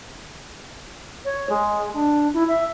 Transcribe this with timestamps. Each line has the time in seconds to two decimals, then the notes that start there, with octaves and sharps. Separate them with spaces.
1.25 C#5
1.49 G#3
1.94 D4
2.33 E4
2.48 E5